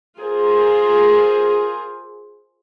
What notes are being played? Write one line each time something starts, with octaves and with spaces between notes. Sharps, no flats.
F4 G#4 A#4 C5